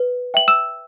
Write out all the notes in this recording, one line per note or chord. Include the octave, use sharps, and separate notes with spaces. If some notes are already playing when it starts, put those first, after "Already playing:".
Already playing: B4
E5 G5 F#7
E6 E7